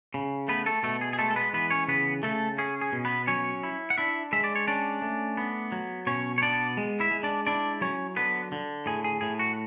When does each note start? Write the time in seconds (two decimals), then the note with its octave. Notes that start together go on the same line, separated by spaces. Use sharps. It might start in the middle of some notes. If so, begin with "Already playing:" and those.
0.14 C#3
0.48 A3 B3 B4
0.66 A3 A4
0.83 B2 A3 A4
1.01 G#4
1.13 G#4
1.18 G#3 A3 A4
1.31 A4
1.36 B3 B4
1.53 E3 B3 B4
1.71 C#4 C#5
1.88 C#3 B3 B4
2.23 C#3 A3 A4
2.58 C#4 G#4
2.81 G#4
2.92 B2
3.05 B3 B4
3.27 F#3 C#4 C#5
3.63 E4
3.90 F#5
3.98 D4 E4 E5
4.33 G#3 E5
4.44 D5
4.55 C#5
4.67 C#4 D4 D5
5.02 A3
5.37 B3
5.72 F#3
6.07 B2 C#4 C#5
6.38 C#5
6.42 B3 D4 D5
6.77 G#3
7.00 E4 E5
7.11 G#3
7.23 D4 D5
7.47 D4 E4 D5
7.81 F#3 C#4 C#5
8.16 D3 B3 B4
8.52 D3
8.86 A2 G#4
9.04 G#4
9.21 A2 G#4
9.39 F#4